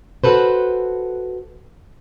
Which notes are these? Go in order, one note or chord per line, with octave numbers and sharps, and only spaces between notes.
F#4 A4 B4 C5